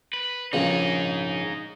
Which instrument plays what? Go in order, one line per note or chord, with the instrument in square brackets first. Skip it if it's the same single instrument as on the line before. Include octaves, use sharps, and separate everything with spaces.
[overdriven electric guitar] B4
[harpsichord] A#1 C#3 C#4 [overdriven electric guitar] D#4 G#4